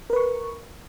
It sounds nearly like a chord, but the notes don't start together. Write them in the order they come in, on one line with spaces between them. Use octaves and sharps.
A#4 B4 C#6